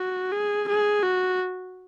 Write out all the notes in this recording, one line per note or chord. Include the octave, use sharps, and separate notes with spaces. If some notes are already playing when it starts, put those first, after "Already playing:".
Already playing: F#4
G#4
G#4
F#4